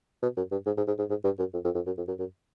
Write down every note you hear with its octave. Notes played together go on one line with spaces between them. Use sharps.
B2
F#2
G2
G#2
G#2
G#2
G#2
G#2
G2
F#2
F2
F2
F2
F#2
F2
F#2
F#2